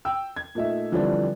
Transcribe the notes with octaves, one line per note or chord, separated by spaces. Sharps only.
G5 E6
G#6
A#2 A3 D#4 E5
D3 E3 F3 G3 C4 D4